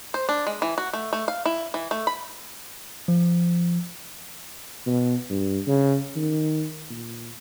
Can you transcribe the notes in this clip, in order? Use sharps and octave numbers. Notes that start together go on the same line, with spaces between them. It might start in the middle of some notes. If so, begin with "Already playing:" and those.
C5
D4
G#3
E3
F#4
A3
A3
F5
E4
E3
A3
B5
F3
B2
G2
C#3
D#3
A#2